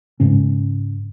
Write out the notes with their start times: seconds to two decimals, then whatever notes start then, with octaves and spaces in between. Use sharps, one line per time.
0.20 G#2 C#3 C#4